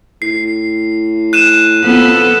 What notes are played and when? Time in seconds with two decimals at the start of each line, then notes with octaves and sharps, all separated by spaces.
0.22 A2 C7
1.33 F#6 D#7 E7
1.83 F2 B3 A4